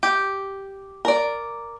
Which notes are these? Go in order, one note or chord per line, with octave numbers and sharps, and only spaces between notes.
G4
A#4 D5